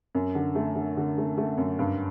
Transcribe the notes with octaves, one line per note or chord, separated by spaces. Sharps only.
F#2
D3
A3
D3
D3
A3
A3
F#2
G2